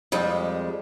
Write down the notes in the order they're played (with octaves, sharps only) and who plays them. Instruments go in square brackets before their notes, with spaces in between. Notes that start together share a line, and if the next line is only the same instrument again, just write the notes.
[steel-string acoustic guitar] F2 G3 G#3